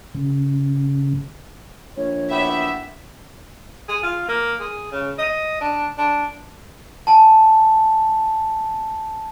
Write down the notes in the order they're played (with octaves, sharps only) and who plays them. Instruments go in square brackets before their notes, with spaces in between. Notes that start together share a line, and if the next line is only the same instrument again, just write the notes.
[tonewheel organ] C#3
[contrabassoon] A#1 [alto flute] C#5
[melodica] B3 E4 G4 [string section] E5
[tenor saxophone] G#4
F4
A#3
G#4
C#3
D#5
D4
D4
[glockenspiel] G#5 A5